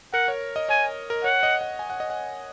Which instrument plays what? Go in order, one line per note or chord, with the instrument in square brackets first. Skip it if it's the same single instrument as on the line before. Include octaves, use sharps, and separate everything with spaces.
[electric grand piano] A#4 [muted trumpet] F#5
[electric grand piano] C#5
D#5
[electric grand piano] C#5 [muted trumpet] G#5
[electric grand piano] A#4
[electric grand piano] C#5 [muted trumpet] F#5
[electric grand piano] D#5
F#5
G#5
F#5
D#5
F#5